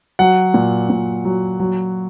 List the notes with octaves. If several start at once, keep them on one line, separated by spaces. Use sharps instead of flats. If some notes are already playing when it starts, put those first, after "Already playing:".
F#3 F#5
A#2
A#2
F#3
F#3